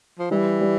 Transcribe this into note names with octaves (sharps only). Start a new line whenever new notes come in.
F3
E3 G3
G3